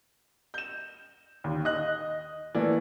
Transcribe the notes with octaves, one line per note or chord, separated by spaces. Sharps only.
G6 E7
D#2 D#3
D#5 F#6
E3 A3 A#3 D5